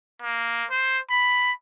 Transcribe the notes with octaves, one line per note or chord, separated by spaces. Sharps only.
A#3
C5
B5